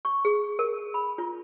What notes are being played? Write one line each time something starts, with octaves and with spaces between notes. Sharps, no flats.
C#6
G#4
A#4
B5
F4